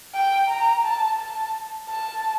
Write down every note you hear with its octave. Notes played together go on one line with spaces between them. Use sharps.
G5
A#5
A5
A5
A5